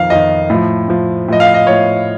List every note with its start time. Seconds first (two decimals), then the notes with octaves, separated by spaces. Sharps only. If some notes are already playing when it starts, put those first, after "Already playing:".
Already playing: F2 D#3 F5
0.10 F2 D#3 D#5
0.50 A2 F3
0.88 A2 F3
1.28 A2 F3 D#5
1.40 F5
1.54 D#5
1.66 A2 F3 C#5